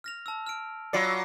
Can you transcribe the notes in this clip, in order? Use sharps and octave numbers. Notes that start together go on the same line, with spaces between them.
F6 A#6 F7
A5 E6
F6 D7
F#3 F4 D5 B5 C7 C#7